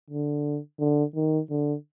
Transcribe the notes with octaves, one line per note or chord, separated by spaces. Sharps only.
D3
D3
D#3
D3